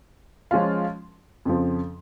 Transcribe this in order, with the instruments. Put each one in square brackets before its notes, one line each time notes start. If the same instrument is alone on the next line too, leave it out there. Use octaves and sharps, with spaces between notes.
[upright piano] F3 G#3 C#4 F4
F2 C#3 F3